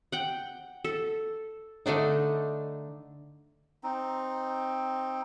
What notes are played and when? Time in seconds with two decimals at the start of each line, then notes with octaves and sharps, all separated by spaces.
0.12 F#5 G5
0.84 A4
1.86 D3 A3 D4 D#4
3.83 C4 D#4